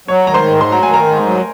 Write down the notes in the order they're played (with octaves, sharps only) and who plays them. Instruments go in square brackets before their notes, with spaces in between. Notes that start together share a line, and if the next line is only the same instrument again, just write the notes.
[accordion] F#3 [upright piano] C#5
[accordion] D#3 [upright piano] A#5
[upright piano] C5 C6
[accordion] G#2
[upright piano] C6
[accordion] F#3
[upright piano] A#5
[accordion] D#3 [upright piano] G#5
[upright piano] A#4 A#5
[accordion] G#2
F#3